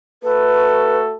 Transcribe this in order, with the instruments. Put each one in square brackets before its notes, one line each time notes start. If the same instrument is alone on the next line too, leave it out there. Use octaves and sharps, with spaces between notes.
[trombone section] A3 F#4 A4 [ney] B4